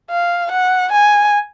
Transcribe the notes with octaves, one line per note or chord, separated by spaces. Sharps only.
F5
F#5
G#5